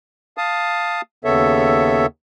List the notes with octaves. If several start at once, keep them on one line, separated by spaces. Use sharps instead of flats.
F5 A5 D#6
D#2 C#3 B3 A4 C#5 E5